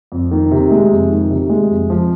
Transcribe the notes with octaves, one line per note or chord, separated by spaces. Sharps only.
F2
D#3
C3
G#3
F2
D#3
C3
G#3
F2
F3